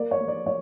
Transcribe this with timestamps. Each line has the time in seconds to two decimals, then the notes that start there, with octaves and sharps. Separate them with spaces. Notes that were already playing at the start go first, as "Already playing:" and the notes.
Already playing: A#3 D5
0.11 C#5
0.20 A#3
0.28 D5
0.46 C#5